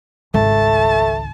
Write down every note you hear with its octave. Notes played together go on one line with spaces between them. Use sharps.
G#1 C#2 A3 A5